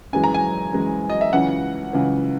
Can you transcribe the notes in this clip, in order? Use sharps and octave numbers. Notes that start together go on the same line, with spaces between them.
F#2 E3 G#3 G#5
A#5
G#5
F#2 E3 G#3
D#5
E5
C#2 C#3 E3 F#5
C#2 C#3 E3